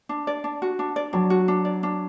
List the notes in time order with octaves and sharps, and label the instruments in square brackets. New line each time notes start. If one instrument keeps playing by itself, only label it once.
[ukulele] D4
D5
D4
F#4
D4
D5
[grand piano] F#3 [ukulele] D4
[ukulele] F#4
D4
D5
D4